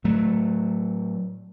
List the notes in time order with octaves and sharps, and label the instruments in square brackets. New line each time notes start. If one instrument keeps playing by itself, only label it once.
[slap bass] A2 F#3 A3